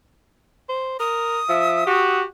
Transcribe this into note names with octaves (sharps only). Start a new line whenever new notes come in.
C5
A#4 D#6
F3 E5
F#4 G4